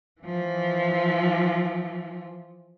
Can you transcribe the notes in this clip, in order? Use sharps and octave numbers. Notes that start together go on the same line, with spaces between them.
E3 F3